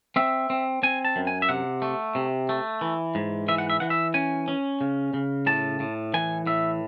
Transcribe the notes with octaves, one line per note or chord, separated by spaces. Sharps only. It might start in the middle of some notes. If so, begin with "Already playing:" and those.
C4 E5
C4
C4 G#5
A5
F#2
G#5
E5
C3 F#5
A3
C3
A3
E3
G#2
E3 E5
F#5
E5
E3 F#5
E5
C#4 G#5
C#4
C#3
C#3
A2 A5
A2
E3 G#5
A2 E5